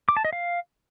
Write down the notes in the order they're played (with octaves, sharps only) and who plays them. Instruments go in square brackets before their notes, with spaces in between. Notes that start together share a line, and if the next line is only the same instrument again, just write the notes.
[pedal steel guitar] D6
A5
D#5
F5